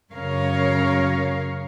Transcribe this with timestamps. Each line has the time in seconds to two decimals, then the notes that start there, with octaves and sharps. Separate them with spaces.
0.14 F#2 C#3 C#4 A#4 C#5 F5